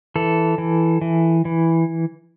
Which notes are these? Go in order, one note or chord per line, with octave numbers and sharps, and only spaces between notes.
E3 A4
E3
E3
E3